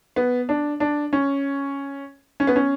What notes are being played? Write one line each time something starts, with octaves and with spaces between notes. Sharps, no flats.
B3
D4
D4
C#4
C#4
B3
C#4